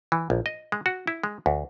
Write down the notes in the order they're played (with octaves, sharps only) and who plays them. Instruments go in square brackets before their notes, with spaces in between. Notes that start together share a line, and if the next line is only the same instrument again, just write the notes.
[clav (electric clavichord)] E3
A#1
D#5
G#3
F#4
E4
G#3
D2